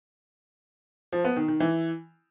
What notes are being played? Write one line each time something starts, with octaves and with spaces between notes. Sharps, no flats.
F3
B3
D#3
D#3
E3